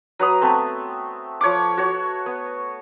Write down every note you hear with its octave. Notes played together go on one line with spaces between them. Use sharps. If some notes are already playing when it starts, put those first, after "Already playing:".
F#3 B4 A#5 D#6
A3 B3 C4
F3 C#5 F#5 D6
F#4 C#5
B3